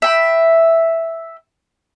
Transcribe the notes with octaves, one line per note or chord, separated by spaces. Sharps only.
E5 G5 B5